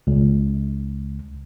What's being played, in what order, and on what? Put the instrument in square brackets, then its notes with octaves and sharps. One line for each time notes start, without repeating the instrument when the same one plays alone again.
[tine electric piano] C#2